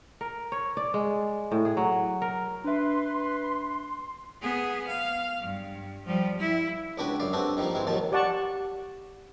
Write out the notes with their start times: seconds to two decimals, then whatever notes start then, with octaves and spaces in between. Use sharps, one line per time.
0.21 A#4
0.52 C#5
0.77 D5
0.94 G#3
1.51 A2
1.65 G#4
1.77 F#3
2.22 A#4
2.64 D4 B4 E5 C6
4.42 B3 G#4
4.88 F5
5.40 G2
6.05 F3 G3
6.39 E4
6.98 C#2 B3 D4 F#4 B4 G5
7.20 F#2 D5 F5
7.33 B3 C4 D4 F#4 G4 A4
7.57 D#3 F3 G3 A#3
7.75 G#2 E3 G#3 C4
7.87 D#2 D#3 F3 F#3 A5
8.12 G4 D5 F#5 A5 C#6